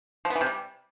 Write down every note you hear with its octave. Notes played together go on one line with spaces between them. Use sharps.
F3
B3
E3
C3
G3